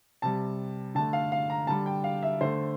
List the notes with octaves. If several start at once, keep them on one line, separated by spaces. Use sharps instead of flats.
C3 G3 A5
D3 A3 A5
F5
F5
A#5
D3 G3 A5
G5
F5
E5
D3 A3 C5